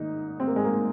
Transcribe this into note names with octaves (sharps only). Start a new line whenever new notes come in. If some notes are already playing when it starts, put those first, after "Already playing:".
Already playing: G#2 D#3 D#4
C4
A#3
G#3
A#3